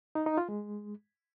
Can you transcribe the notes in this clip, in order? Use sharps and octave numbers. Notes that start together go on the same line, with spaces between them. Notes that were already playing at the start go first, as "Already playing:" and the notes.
D#4
D#4
F4
G#3